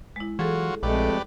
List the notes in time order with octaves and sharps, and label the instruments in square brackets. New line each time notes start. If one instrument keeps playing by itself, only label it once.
[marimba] G#3 E4
[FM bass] E3 [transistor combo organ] F#3 F4 F#4 [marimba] G#4 A4
[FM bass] A#1 [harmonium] F2 G#3 A3 [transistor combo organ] G4 B4 D5